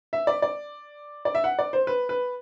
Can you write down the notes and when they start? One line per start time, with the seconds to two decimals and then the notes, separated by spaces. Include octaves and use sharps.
0.13 E5
0.27 D5
0.42 D5
1.25 D5
1.35 E5
1.44 F#5
1.59 D5
1.73 C5
1.87 B4
2.09 B4